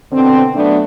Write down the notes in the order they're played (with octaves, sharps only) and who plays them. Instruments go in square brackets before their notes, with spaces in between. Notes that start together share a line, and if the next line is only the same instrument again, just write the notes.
[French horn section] B2 D3 C4
F#3 A3 B3 D4